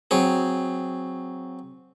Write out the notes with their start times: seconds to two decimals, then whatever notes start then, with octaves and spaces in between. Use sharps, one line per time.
0.11 F#3 C4 G#4